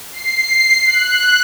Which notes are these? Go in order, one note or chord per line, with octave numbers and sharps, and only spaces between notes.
C7
F#6